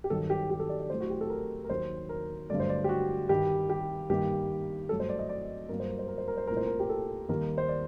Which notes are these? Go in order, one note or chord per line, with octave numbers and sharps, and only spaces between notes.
G4
G2 D#3 F#3 A4
G4
G4
A4
D5
D5
A2 F#3 A3 C5
F#4
G4
A4
A#4
A#4
D#2 D#3 F#3 C5
A#4
G2 D3 F#3 A3 D5
C5
D5
G4
F#4
G2 D#3 G3 G4
G4
G2 D#3 G3 A#3 G4
G2 F#3 A3 A4
C5
D5
D#5
D5
G2 F#3 A#3 A#4
C5
A#4
C5
A#4
C5
A#4
C5
C2 A#2 A3 A#4
C5
A#4
G4
A4
D#2 D#3 G3 A#3 A#4
C5
D5